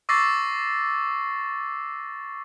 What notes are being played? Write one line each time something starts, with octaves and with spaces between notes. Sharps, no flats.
C#6 D6 E6 A6 A#6 C7